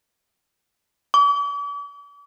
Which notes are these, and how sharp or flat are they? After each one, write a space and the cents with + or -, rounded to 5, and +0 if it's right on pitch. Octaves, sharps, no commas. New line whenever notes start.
D6 -45